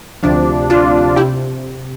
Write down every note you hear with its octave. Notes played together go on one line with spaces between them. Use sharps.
D2 C3 F3 D4
D4 F4
C3 E4 G4